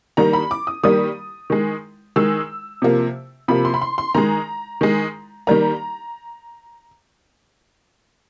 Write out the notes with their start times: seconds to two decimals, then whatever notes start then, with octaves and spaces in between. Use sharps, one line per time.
0.17 D#3 G3 A#3 A#5
0.33 B5
0.51 D6
0.67 D#6
0.83 D#3 G3 A#3 D#6
1.50 D#3 G#3
2.16 D#3 G#3 E6
2.82 C3 F3 A#3
3.48 C3 F3 A#3 B5
3.65 C6
3.74 B5
3.82 C6
3.98 C6
4.15 D#3 G#3 A#5
4.81 D#3 G#3
5.47 D#3 G3 A#3 A#5